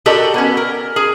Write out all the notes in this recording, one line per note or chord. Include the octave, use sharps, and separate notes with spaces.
F#4 G4 A4 A#4 D5 D#5
B3 C#4
A#4
G#4